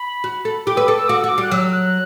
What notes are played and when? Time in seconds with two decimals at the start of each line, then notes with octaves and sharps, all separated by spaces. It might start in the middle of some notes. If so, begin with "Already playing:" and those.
Already playing: B5
0.24 F#4
0.45 A4
0.67 G4 D6
0.77 B4 E6
0.87 A4 D6
0.98 E6
1.08 F#4 D6
1.18 E6
1.24 F#4 D6
1.38 G3
1.43 F#6
1.51 F#3 E6
1.73 F#6